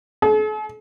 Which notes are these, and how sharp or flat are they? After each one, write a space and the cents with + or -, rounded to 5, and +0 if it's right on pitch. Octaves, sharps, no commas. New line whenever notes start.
A4 -45